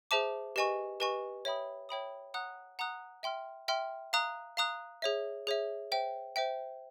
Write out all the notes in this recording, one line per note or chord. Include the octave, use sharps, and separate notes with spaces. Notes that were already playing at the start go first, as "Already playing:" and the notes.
G#4 C5 E5 A5 D6
G4 B4 D#5 G#5 C#6
G4 B4 D#5 G#5 C#6
C#5 E5 G5 B5 D#6
C#5 E5 G5 B5 D#6
F#5 A#5 D#6 F#6
F#5 A#5 D#6 F#6
E5 G5 C6 F6
E5 G5 C6 F6
F5 A#5 D#6 F#6
F5 A#5 D#6 F#6
G#4 C#5 E5
G#4 C#5 E5
C5 E5 G5
C5 E5 G5